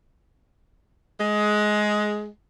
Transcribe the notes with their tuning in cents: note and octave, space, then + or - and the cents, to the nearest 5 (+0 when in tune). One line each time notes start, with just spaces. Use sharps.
G#3 +15